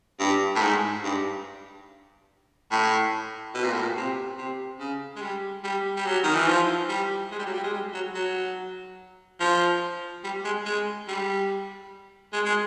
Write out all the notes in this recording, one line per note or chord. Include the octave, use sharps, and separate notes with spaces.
G2
A2
G#2
G2
A2
B2
A#2
A2
A#2
C3
C3
C#3
G#3
G3
G3
G3
F#3
D#3
E3
F3
G3
G#3
G3
F#3
G3
G#3
G3
F#3
F#3
F3
G3
G#3
G#3
G3
G#3
G#3